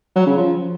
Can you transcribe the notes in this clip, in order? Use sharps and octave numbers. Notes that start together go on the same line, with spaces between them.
F#3
C#3
F3